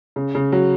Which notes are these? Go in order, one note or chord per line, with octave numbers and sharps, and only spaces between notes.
C#3
C#3
F#3